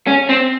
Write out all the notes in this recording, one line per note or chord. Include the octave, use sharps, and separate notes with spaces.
C#4
C4